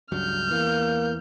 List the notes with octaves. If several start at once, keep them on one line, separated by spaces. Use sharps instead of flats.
C#2 G2 F#3 F6 G6
E2 E3 A#3